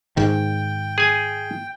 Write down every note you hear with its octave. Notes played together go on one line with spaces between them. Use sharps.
G#2 D#3 G5
G#4 G#5